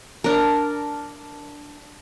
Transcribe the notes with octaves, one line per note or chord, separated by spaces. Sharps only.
D4 A#4